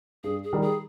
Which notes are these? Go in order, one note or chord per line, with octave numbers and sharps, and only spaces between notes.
G2 G#4
G#4
D#3 G3
G#4